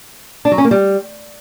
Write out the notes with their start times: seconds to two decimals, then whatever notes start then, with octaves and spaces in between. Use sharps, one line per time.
0.45 D4
0.52 F#3
0.58 C#4
0.65 A#3
0.71 G3